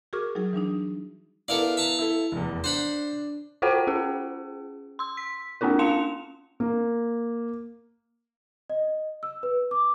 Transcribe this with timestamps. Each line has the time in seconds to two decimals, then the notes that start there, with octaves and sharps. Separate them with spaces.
0.13 F#4 G#4 A#4 C#6 D6 F6
0.35 F#3 G3 D#4 F#4 G#4
0.53 E3 G3 D4 D#4
1.48 B3 E4 A4 A#4 D5 F5
1.77 E5 A5 A#5
1.99 E4 A4
2.32 F1 E2
2.64 D4 C5 F#5 B5
3.62 F4 F#4 A4 C5 F#5 G5
3.87 C#4 G#4
4.99 C6 E6
5.17 B6
5.61 A#3 C4 D4 F4 A#4
5.79 C#4 F5 C6 C#7 E7 F7
6.60 A#3
8.70 D#5
9.23 E6
9.43 B4
9.71 D6